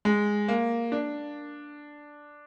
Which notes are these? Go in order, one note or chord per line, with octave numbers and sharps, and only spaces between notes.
G#3
A#3
D4